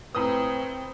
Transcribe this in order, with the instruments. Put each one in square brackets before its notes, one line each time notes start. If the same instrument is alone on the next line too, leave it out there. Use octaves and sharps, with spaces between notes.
[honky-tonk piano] A2 D#6 [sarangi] C4 [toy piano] B4 A#5